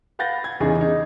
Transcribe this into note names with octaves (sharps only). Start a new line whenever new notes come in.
B4 F5 F#5 G6 A6 A#6
G#6
E2 C#3 D#4 G#4
D#4